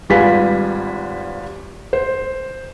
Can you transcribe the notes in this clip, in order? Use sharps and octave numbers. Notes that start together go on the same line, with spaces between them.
G#1 G3 F4 B4 G#5 B6
C5